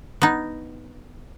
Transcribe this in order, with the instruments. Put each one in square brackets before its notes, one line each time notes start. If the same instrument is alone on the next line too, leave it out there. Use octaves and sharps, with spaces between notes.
[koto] B3 D#4